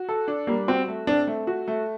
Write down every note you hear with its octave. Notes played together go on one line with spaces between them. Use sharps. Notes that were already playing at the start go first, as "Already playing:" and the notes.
Already playing: F#4
A4
D4
G3 A#3
C4 F#4
A3
C4 D4
A3
F#4
A3